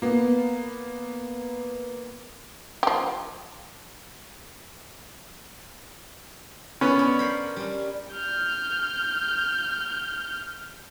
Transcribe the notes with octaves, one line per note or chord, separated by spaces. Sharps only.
A#3 B3
F3 G4
B3 C#4
D4 C#5
A#4 C5 B5
G3 C#4
F6 G6